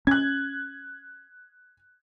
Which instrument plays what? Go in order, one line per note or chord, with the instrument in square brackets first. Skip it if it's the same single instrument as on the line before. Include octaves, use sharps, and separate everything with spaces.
[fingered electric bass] C#4 [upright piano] F#6 G#6